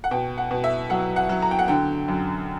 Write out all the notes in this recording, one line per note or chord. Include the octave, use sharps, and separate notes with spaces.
F#5
B2 G5
F#5
B2
E5
F#3 F#5
F#5
F#3
A#5
G5
F#5
D3 G5
F#2